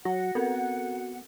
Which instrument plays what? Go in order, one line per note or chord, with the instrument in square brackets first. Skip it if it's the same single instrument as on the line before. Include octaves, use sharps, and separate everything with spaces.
[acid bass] F#3 [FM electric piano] F#4 [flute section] F#5 [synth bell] A#6
[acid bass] B3 [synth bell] C4 A4 A#4